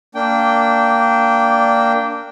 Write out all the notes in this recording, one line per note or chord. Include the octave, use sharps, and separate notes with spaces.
A#3 D4 G5